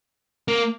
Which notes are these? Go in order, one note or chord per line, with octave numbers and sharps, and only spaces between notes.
A#3